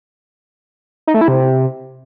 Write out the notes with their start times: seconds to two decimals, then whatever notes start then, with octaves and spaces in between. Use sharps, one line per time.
1.07 D#4
1.14 A3
1.21 E4
1.28 C3